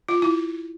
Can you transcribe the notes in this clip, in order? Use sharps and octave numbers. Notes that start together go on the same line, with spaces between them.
F4
E4